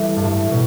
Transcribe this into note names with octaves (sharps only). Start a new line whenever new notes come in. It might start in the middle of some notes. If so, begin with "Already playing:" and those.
Already playing: E3 G3 A3
G2
A2
B2